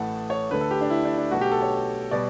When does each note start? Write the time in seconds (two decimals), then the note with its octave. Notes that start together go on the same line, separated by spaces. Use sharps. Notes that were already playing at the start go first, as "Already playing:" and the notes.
Already playing: A1 A2 E3 A3 F#5 A5
0.30 C#5
0.50 D2 D3 A3 B4
0.61 A4
0.71 G4
0.81 D4
0.90 E4
1.05 D4
1.17 D4
1.31 B1 B2 A3 F#4
1.41 G4
1.52 A4
1.62 C#5
2.11 B2 G3 D5